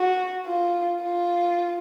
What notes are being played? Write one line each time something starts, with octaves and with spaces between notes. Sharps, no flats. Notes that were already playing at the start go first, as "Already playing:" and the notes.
Already playing: F#4
F4
F4